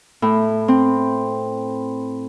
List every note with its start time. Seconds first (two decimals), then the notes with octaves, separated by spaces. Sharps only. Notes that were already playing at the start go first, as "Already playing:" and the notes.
0.22 A2
0.68 C4